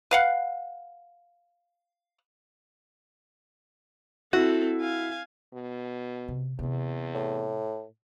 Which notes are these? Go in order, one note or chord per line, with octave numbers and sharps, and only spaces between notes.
B4 F5 F#5
C4 E4 F#4 A4
F5 G#5
B2
C3
E2 C3 C4
A2